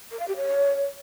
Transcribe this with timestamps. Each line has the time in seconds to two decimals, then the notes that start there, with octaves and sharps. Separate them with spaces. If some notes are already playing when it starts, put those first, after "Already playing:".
0.11 A#4
0.19 F5
0.27 G4
0.36 C#5